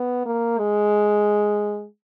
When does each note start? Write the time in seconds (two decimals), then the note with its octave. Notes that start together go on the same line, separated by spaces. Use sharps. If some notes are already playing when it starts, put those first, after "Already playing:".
Already playing: B3
0.26 A#3
0.59 G#3